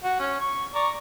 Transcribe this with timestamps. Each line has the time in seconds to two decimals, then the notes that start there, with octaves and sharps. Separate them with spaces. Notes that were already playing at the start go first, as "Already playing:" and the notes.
0.04 F#4
0.20 C#4
0.40 C#6
0.75 D5 A#5 C#6